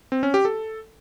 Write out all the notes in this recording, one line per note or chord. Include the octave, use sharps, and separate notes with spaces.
C4
C#4
G4
A4